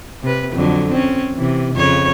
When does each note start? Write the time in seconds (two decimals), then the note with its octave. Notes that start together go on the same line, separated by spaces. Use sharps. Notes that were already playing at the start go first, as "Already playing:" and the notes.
0.23 C3 B4
0.53 F2 D3 F#3
0.91 C4 C#4
1.36 C3 E3
1.74 F2 C#3 C#5